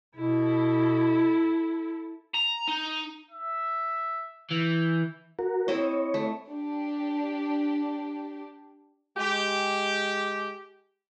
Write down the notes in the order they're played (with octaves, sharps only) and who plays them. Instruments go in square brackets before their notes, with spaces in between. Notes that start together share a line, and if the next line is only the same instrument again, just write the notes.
[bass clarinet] B2 [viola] E4 A4
[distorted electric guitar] A#5
D#4
[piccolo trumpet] E5
[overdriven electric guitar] E3 [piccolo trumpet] G6
[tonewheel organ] F#4 A#4
[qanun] C4 E4 D#5 [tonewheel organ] C#5
[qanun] A3
[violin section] D4 G4
[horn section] G#3 G4